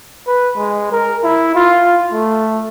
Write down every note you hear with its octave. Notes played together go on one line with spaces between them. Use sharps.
B4
G#3
A#4
E4
F4
A3